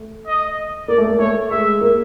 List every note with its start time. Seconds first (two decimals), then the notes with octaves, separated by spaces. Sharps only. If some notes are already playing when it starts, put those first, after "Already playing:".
Already playing: A3
0.27 D#5
0.88 A#3 D5
0.98 A3
1.08 A#3
1.19 A3 C#5
1.51 G#3 E5
1.81 A#3